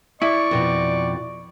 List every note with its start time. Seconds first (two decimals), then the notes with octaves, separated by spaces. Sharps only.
0.22 E4 D5 C#6
0.51 F2 B2 F3